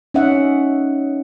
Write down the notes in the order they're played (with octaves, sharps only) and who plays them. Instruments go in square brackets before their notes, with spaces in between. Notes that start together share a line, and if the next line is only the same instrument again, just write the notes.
[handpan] C#4 D#4 D#5 E5 F#5